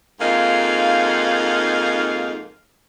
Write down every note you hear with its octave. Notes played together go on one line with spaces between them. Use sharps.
F2 G#2 A#3 D#4 F5